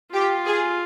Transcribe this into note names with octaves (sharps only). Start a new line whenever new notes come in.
F4 G4
G#4